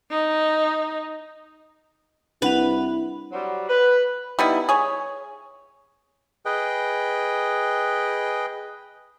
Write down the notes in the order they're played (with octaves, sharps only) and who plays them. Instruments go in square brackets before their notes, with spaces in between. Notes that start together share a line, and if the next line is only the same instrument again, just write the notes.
[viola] D#4
[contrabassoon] C2 [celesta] D4 F#5 F7 [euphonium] E4 [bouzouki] B4
[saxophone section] F#3 G3 F#4 C5
B4
[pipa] G3 B3 D#4 E4
G#4 C#5
[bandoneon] G#4 B4 D#5 G5